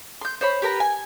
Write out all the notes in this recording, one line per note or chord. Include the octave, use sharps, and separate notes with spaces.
C6 G6
C5 C#5 B5
G4 A#4 B4 A#5
G#5